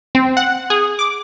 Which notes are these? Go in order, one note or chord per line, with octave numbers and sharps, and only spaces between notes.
C4
F#5
G#4
D6